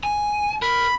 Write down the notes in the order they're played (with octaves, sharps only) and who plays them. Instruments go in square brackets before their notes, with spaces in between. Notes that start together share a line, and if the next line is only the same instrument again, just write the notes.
[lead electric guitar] G#5
[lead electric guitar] A#4 [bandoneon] B5